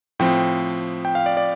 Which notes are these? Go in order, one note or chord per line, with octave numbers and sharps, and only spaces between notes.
A2 F3 C4 G5
G5
F5
D5
D5